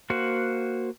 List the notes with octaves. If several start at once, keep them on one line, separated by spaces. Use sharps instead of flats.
A#3 F#4 C5 F#5